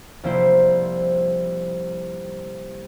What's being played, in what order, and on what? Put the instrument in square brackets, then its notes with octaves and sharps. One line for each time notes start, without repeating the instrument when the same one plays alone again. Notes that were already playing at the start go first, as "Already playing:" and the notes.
[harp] C2 F3 A#3 C4 E4 C5